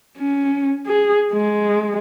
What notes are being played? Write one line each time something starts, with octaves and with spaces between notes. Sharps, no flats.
C#4
G#4
G#3